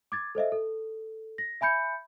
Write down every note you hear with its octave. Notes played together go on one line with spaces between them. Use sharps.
D6 G#6 A6
A4 C5 D#5 E5
A4
A#6
E5 G#5 B5 G6 C#7